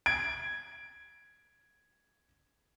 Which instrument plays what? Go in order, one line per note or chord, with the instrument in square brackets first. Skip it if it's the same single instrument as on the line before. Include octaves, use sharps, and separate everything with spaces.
[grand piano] G#6 D7